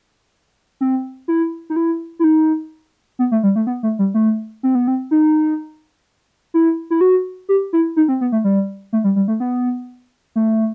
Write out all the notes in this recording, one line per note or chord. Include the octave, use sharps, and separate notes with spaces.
C4
E4
D#4
E4
E4
D#4
B3
A3
G3
A3
B3
A3
G3
A3
C4
B3
C4
D#4
E4
E4
F#4
G4
E4
D#4
C4
B3
A3
G3
A3
G3
G3
A3
B3
A3